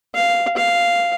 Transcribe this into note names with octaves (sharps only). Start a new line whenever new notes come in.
F5
F5